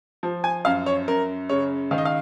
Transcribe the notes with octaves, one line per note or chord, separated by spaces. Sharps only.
F3
G#5
F#2 F5
C#5
F#2 A#4
C#3 C#5
D#3 F5
D#5
F5